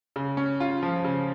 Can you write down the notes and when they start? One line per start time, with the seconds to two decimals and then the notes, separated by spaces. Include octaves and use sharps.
0.16 C#3
0.37 C#4
0.60 F4
0.83 F3
1.05 C#3